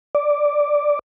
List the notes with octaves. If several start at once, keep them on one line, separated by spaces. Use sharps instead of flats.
D5